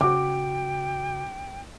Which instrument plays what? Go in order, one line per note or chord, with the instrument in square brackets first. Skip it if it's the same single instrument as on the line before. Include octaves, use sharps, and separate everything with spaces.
[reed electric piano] C#3 F#4 [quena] G5 [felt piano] D6